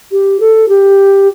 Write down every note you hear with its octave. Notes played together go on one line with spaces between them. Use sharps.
G4
A4
G4